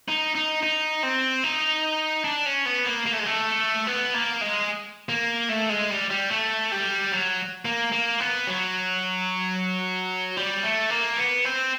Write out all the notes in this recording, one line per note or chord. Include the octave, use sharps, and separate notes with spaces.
D#4
D#4
D#4
C4
D#4
D4
C#4
B3
A#3
A#3
A3
G#3
A3
B3
A#3
G#3
A#3
A3
G#3
G3
G3
A3
G3
F#3
A#3
A#3
B3
F#3
G3
A3
A#3
B3
C4